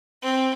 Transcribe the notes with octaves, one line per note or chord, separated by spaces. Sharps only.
C4